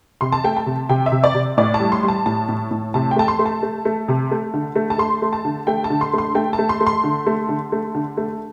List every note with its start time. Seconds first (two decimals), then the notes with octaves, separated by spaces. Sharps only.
0.21 C3 C6
0.32 A5
0.44 A3 G5
0.57 A5
0.66 C3
0.89 C3 G5
1.06 E5
1.12 C3
1.24 D5
1.34 C3
1.57 A2 D5
1.74 A5
1.80 G3
1.92 C6
2.03 G3
2.08 A5
2.26 A2 A5
2.49 A2
2.71 A2
2.94 C3 A5
3.11 G5
3.16 A3 A5
3.28 C6
3.39 A3
3.46 A5
3.63 A3
3.85 A3
4.08 C3
4.31 A3
4.54 D3
4.76 A3
4.90 A5
4.98 A3 C6
5.22 A3
5.33 A5
5.45 D3
5.67 A3 G5
5.84 A5
5.90 D3
6.01 C6
6.13 A3 C6
6.35 A3 G5
6.53 A5
6.59 A3
6.69 C6
6.80 A3
6.87 C6
7.04 D3
7.27 A3
7.49 D3
7.72 A3
7.95 D3
8.17 A3